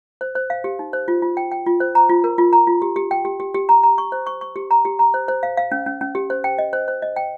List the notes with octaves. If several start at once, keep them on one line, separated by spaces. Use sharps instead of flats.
C5
C5
F5
G4
D#4
C5
F4
F4
G5
G5
F4
C5
A#5
F4
A#4
F4
A#5
F4
G4
G4
G5
G4
G4
G4
A#5
A#5
C#6
C5
C#6
C#6
G4
A#5
G4
A#5
C5
C5
F5
F5
C#4
C#4
C#4
G4
C5
G5
D#5
C5
C5
D#5
G5